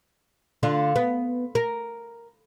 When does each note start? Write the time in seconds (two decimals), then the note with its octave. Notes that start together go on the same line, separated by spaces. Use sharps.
0.63 D3 D4 F4
0.96 B3
1.55 A#4